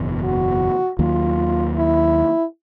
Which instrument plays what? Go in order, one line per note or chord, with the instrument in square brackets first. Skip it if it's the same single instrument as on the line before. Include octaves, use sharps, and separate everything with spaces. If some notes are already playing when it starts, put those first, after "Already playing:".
Already playing: [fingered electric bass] F#1 E2 B2
[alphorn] F#4
[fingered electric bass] D#2 D#3 F#3 A#3 [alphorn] F4
[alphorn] E4